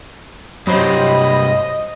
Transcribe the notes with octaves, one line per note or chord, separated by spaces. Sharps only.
G2 C3 F#3 C5 D#5 B5